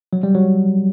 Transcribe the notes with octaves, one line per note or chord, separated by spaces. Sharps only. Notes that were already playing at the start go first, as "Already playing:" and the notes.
F#3
G3
F#3